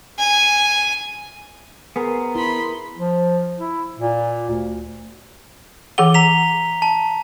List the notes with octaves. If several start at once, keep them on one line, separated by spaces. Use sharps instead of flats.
G#5
B3 G#4 A#4 C5
E4 B5 C6
F3
E4
A#2
D2
E3 G#4 F#5 G7
A#5 B6 F7
A5